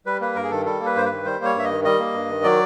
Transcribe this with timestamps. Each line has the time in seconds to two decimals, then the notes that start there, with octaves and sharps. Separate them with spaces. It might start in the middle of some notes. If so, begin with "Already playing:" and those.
0.06 G3 B4
0.21 A#3 B4
0.36 G2 A#4
0.43 G#4
0.50 D#3 A4
0.66 G3 A4
0.80 A#3
0.86 B4
0.96 G2 C5
1.06 B4
1.11 D#3
1.25 G3 C5
1.39 A#3
1.44 C#5
1.55 G2 E5
1.64 D#5
1.70 D#3
1.85 G3 D#5
2.00 A#3
2.14 G2
2.29 D#3
2.43 F#3 D5